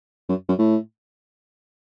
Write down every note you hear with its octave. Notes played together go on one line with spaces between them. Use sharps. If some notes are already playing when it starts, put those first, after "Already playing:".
F#2
F#2
A2